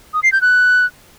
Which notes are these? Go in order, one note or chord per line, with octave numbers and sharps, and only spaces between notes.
D#6
C7
G6
F#6